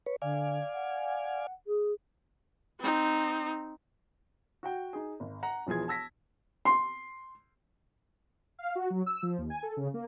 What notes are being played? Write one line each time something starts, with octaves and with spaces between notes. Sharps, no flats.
B4 C#5
D3 D5 F5 G#5
F#5
G#4
C4 D#4
F#4 F#5 G5
D#4 G#4
G#1
F#5 A#5
E1 E3 F3 G#4 G#6
A5 E6 A#6 B6
C6
F5
F#4
F#3
E6
F3
D#2
G#5
A4
C#3
A#3